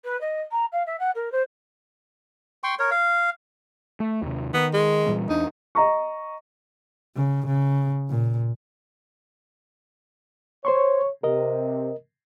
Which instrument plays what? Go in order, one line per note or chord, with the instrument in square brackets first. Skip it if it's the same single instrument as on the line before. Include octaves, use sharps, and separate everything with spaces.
[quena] B4
D#5
A#5
F5
E5
F#5
A#4
C5
[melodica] G5 C6 C#6
A#4 C#5
F5
[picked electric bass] A3
D#2 C3
[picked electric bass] D#3 [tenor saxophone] B3
[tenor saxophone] G#3
[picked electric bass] A#2 E3 G3
[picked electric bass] E2 D4 [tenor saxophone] D#4
[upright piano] D#5 A#5 C#6
[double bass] C#3
C#3
A#2
[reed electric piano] C5 C6 C#6 [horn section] C#5
[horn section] C3 [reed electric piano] A#4 D#5